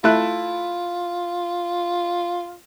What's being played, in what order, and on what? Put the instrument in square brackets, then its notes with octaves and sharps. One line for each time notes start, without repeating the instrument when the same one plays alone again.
[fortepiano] A3 E4 F#6 [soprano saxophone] F4